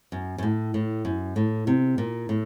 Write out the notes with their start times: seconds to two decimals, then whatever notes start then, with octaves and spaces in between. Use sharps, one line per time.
0.12 F#2
0.38 F#2
0.43 A2
0.74 A2
1.05 F#2
1.36 A2
1.67 C3
1.98 A#2
2.29 A2